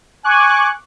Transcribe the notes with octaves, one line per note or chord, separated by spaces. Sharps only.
G#5 C#6 D6 F#6